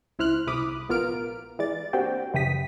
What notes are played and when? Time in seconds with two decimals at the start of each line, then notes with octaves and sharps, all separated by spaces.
0.19 C#2 E4 C5 F6 F#6
0.47 C2 E4 B5 D6 D#6
0.89 A#1 B3 F4 A#4 F6 D7
1.59 E3 G#3 D5 A6
1.93 A#3 C4 D4 F#4 G4 G5
2.34 F#2 C#3 E3 G4 D#6 B6